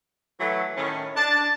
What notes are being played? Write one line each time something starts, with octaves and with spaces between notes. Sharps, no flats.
E3 F#3 A3
A2 D#3 C#4
D4 A5